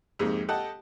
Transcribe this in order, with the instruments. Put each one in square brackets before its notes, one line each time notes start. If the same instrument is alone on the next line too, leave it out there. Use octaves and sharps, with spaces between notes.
[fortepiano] F2 G#2 C3 G#3 A#3
G4 A4 D#5 F#5 A5